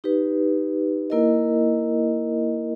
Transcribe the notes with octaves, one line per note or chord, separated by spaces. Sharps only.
D#4 G4 B4
A#3 E4 A#4 D#5